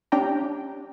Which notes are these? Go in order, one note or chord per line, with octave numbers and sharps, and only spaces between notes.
C#4 D4 G4 G5 A#5